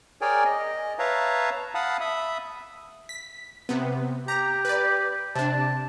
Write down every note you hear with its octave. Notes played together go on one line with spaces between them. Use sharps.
G#4 A#4 C#5 D5 G5 G#5
D#5
B4 C#5 E5 F5 A5 A#5
F5 F#5 A5 B5 D#6
E5 B5 D#6
B6
C3 B3
G4 A#5
B4 D5
C3 D4 A5